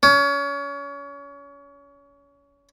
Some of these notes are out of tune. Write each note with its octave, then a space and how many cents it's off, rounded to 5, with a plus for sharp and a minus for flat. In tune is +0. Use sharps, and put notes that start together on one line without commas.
C#4 +30